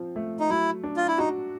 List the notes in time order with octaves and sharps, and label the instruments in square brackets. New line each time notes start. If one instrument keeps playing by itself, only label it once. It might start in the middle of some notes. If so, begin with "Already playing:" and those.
Already playing: [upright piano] F3 C4
A3
[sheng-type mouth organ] D#4
[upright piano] F#3 [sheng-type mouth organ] E4
[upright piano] D4
[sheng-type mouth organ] F4
E4
[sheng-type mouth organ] D#4 [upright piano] F#4